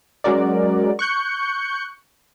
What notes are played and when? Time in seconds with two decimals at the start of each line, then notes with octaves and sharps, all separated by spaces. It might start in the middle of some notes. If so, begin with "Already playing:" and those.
0.24 F#3 G#3 C#4 F#4 A#4 D5
0.99 C#6 F#6 G6 C#7